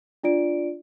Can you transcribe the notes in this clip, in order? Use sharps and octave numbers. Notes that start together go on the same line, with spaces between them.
D4 F4 D5 D7